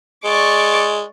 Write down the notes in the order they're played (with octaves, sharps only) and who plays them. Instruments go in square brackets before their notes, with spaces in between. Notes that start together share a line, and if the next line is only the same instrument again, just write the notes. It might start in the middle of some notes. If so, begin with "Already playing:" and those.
[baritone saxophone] G#3 [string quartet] D5 C#6 D6